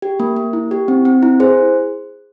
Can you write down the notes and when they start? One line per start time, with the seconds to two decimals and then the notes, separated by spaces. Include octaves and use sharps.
0.02 G4
0.20 A#3
0.36 A#3
0.53 E4
0.71 G4
0.88 C4
1.05 C4
1.23 E4
1.40 G#4 C5